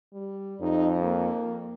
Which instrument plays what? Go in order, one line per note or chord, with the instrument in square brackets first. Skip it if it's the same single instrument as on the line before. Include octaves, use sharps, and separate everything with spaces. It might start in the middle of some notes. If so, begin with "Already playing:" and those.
[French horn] G3
[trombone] F2 [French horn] D#4
[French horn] A#3